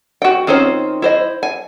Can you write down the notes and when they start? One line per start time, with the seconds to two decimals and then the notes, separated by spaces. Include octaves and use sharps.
0.22 F#4 G5
0.47 D#3 C4 C#4 F4 C5
1.02 E4 C5 D#5
1.43 G#5